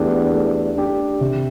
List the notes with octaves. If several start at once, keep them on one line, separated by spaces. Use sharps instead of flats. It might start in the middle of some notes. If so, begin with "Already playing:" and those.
Already playing: E2 A3 D4 G4
A3
D4 G4
C3